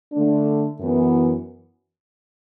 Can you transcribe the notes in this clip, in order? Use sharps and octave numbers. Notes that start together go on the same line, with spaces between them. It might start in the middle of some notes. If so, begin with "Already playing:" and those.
D3 A3 D4
F#2 E3 B3